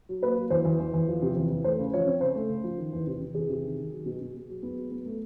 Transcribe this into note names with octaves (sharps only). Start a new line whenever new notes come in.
F#3
A#3 B4
F#3
E2 C5
E2
E2
E2
F3
C3
E2
E2
A3 C5
C#3
F3 C#5
C4
C#3 C5
A3
C#3
F3
D#3
E2
C3
C3
E2 G#4
C3
D#3
D#3
F#3
B2
B2
B2
F#3
B3
F#3
B3
A3